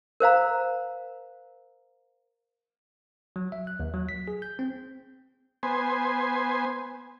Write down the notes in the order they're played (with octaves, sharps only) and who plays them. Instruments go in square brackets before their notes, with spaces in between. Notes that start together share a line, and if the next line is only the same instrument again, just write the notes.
[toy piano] A#4 C5 F5 A#5
[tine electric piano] F#3
E5
F#6
D#2
F#3
B6
G#4
G6
C4
[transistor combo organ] B3 C5 G#5